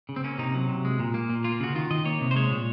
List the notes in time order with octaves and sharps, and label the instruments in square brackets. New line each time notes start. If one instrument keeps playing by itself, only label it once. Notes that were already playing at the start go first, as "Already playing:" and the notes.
[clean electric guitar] C#3
C4
A#3 C#4
C3 D#4
F#3
C3
G#3
A#2
A#3
A#2
A#3 F4
C#3 F#4
D#3 F4
D#3 D#5
A#3 C#5
C3
C5
G#3 C#5
A#2